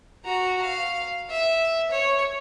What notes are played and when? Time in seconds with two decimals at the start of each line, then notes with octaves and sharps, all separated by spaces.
0.25 F#4 A#5
0.61 F5
1.30 E5
1.91 C#5